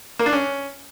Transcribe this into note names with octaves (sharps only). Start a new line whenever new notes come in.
A#3
D4
C#4